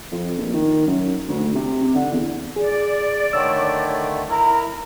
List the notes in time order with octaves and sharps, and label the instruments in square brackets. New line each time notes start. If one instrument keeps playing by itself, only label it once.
[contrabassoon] F2
A#1
D#3
F#2
D2
C3
C3
D3
E2
[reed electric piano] G#4 [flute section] D5
[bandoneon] D3 D#3 A3 [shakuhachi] C#5 [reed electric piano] E6
[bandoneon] E4 A#4 [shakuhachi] A#5